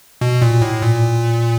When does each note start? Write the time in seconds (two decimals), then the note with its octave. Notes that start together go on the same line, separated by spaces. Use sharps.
0.21 B2
0.42 A#2
0.61 A2
0.82 A#2